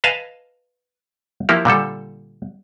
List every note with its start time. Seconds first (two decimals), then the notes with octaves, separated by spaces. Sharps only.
0.04 B4 D#5 F5 G#5 A5
1.49 F3 A#3 E4 G4
1.65 A#2 D3 G3 A4